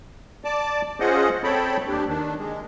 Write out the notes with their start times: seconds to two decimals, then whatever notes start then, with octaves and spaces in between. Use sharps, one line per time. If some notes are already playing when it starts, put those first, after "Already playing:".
0.45 D5 A5 D6
1.00 C#4 F4 G#4 C5 D#5 F#5
1.44 C4 A4 C#5 G5 A5 B5
1.88 D#2 D4 G4
2.08 D#3 D4
2.38 G#3